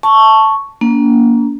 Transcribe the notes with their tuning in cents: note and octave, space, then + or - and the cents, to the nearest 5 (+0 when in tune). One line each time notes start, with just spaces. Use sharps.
A5 +0 C#6 +0
A#3 +10 D4 -45